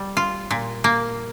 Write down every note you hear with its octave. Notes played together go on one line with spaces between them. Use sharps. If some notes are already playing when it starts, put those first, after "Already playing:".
Already playing: G3
F4
A#2
A#3